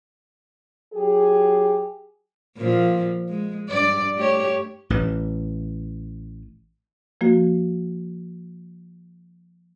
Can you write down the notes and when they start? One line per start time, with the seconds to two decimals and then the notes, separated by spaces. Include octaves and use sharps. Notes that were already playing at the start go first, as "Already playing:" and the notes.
0.94 F#3 G4 G#4
2.57 A#2 F3
3.29 G#3
3.69 G2 D5
4.17 A3 G4 C#5
4.90 A1 E3
7.21 F3 A#3 F#4